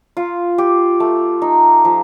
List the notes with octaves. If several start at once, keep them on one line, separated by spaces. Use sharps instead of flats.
F4
G4
A3
D#4
F3